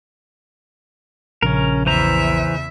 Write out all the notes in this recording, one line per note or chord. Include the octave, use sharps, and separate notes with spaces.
A#1 C#3 C#4 A#4
E2 E3 C5 E5 A#5